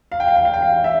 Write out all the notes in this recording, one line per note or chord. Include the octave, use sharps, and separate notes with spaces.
F5
G5
F5
G5
F5
G5
F5
E5